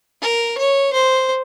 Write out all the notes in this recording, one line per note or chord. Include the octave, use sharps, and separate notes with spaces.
A#4
C#5
C5